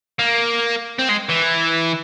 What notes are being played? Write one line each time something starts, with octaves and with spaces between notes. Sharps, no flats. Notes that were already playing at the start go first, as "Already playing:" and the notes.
A#3
C4
G#3
E3